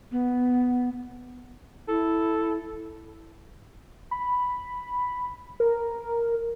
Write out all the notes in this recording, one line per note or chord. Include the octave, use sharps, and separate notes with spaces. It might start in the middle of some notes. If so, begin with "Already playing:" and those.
B3
E4 A4
B5
A#4